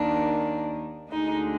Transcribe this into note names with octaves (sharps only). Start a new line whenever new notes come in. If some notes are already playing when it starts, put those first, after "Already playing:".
Already playing: D#2 D#3 A#3 D4
D2 D3 G#3 D#4